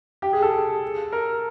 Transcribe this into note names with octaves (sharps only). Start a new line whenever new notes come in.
G4
G#4
A4
A#4